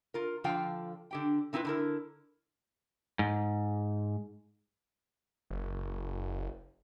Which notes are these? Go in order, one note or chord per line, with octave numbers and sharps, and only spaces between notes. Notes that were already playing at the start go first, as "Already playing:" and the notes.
F4 A#4
D3 F3 F4 F5 G5
D3 G4 G5
D3 C4 E4 F4 B4
D3 E4 A#4
G#2
F#1